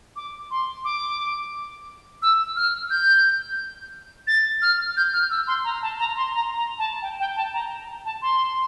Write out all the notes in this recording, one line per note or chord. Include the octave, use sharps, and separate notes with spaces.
D6
C6
D6
E6
F6
G6
A6
F6
G6
F6
E6
C6
A#5
A5
A#5
C6
A#5
A#5
A5
G5
G5
A5
A#5
A5
C6